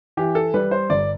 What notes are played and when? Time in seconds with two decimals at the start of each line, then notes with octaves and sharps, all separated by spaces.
0.17 E3 G4
0.35 A4
0.54 G3 B4
0.71 C5
0.90 G1 D5